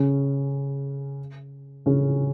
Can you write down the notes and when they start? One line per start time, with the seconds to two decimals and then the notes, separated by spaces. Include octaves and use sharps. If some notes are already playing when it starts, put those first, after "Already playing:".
Already playing: C#3 C#4
1.86 C#3 C#4